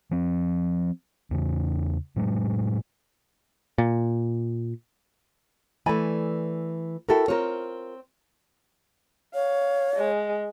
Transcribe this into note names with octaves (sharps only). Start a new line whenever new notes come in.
F3 C4
E2 C#3
A2 F#3 G#3
A#2
E3 A3 D5 G#5 B5
E4 F#4 A4 A#4 G5
C4 F4 A#4 C#5
C#5 F5
G#3